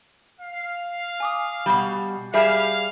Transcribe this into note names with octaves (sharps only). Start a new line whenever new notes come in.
F5
G#5 D6 D#6
B2 G3
G3 G4 G#4 E5 F5 F6 E7